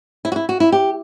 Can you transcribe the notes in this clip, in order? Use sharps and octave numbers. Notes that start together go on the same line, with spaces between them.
E4
F#4
E4
F#4
E4
G4